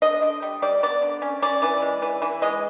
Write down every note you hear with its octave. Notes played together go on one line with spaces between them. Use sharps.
D3 D#5
D3
G3
G3 D5
B3 D5
D3
C#4
C#4 D5
E3 D5
G#3
E3
E3
G#3 D#5